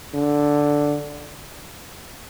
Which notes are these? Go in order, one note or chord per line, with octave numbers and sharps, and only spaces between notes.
D3